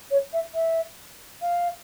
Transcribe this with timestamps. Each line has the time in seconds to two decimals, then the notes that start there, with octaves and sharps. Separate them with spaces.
0.11 C#5
0.33 E5
0.54 E5
1.42 F5